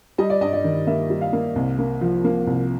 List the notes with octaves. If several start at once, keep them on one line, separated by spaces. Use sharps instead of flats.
G3 D#5
D5
G2 D#5
D5
D#3
A#3 E5
G3
F5
A#3
C2
A#3
F3
A#3
C2